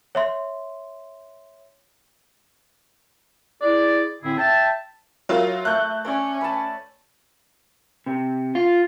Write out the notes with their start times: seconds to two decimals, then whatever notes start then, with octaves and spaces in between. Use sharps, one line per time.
0.15 C#5 E5 C6
3.62 E4 G#4 D5
4.23 A2 D3 C4 E4 G#4
4.38 E5 G5 A5
5.29 F#3 F4 A#4 C#5 E5
5.65 A3 E5 F#6 G6
6.05 C#4 C#5 D5
6.41 B4 A5
8.06 C3
8.55 F4